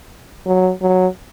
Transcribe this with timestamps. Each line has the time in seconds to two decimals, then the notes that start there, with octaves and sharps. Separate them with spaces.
0.46 F#3
0.82 F#3